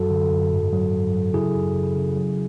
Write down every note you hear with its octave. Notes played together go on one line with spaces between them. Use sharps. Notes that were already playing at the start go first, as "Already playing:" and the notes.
Already playing: F#2 F#3 F#4 A4
D3
F#2
G#2
F#3
G#2
F#3
C#3 E4 G#4
F#2
C#3
C#3
F#3